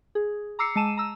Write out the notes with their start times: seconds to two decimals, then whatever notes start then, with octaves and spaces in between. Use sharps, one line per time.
0.15 G#4
0.59 A#5 D6 E6 C7 C#7
0.76 G#3 A5 D#7 E7
0.97 A#5 E6